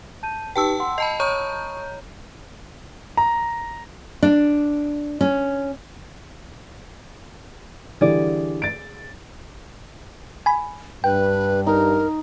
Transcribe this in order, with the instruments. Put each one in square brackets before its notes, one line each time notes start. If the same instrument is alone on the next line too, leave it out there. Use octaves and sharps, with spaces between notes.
[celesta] A5 G6 D#7
[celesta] D#4 G4 B4 [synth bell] G5 A5 E6
[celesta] F#5 C6
[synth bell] D#5 A5 B5 [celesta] C7
[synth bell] C#5 A#5 G6 [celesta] C#6 D#6
[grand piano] A#5
[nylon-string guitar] D4
C#4
[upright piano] D3 E3 G3 [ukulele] G#4 D5
[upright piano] A6 D7
[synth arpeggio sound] G#5 B5
[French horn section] G2 [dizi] B4 [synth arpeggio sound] G5
[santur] D#4 [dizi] A#4